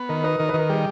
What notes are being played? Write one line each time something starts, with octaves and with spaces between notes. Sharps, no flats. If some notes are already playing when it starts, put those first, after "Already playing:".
Already playing: B3
D#3 A#4
D#4 B4
D#3 A#4
B4
D#3
A#4
G3 G#4